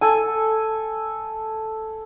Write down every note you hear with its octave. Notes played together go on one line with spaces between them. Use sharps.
A4 G#5